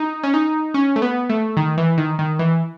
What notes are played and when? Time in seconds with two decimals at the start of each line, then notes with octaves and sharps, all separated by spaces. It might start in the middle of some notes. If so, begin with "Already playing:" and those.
Already playing: D#4
0.23 C#4
0.34 D#4
0.74 C#4
0.96 A3
1.02 B3
1.29 A3
1.57 D#3
1.78 E3
1.98 D#3
2.19 D#3
2.39 E3